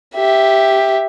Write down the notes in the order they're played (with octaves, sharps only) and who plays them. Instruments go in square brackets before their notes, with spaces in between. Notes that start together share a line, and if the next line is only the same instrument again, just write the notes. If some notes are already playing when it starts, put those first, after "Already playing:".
[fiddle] G4 E5